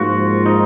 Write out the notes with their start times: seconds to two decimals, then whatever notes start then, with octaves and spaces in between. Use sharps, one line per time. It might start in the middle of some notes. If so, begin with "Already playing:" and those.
Already playing: G#2 F3 A#3 F4 F#4
0.45 D#4